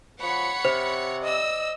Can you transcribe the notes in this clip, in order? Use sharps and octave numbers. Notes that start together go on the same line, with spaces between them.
F3 C#5 F#5 B5 C#7
C3 C5
D5 D#5 E6